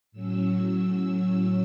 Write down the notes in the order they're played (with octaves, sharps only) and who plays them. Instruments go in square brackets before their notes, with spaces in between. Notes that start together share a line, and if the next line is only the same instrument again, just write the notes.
[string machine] A2 F#3 C#4 E6